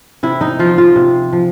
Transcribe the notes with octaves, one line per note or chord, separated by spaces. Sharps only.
C3 E4
D#4
F3 F4
F4
C3
F3